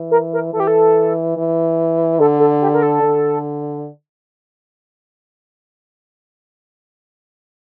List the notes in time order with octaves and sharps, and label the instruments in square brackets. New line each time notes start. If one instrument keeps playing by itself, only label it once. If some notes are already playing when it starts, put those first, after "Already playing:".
Already playing: [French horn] E3
[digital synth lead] A#4
A#4
[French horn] E3 [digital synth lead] A4
[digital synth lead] G4
A4
[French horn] E3
[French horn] D3 [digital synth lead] A4
[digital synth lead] A4
G4
A#4
A4
[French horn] D3